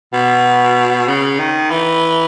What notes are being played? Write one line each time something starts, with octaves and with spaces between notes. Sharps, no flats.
B2
C#3
D#3
E3